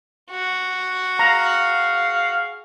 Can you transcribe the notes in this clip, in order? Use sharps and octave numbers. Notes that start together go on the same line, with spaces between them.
F#4
G#4 F5 A#5